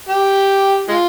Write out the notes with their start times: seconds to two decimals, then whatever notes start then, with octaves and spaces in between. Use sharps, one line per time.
0.09 G4
0.88 G#3 F4